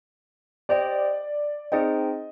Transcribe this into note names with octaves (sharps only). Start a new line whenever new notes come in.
G4 C5 D5 D#5 G5
C4 D#4 G#4 C5 D#5 G5